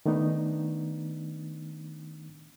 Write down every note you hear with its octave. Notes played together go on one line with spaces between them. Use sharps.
D#3 A3 B3 D4 D#4